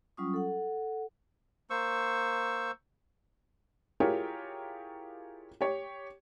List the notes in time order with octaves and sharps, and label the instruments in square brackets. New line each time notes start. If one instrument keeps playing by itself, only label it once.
[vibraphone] F#3 G3 C#4 F4 C#6 D#6
A4 F#5
[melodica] A#3 C5 C#6 E6
[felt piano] E4 F4 G4 G#4 A#4 C#5
G4 C#5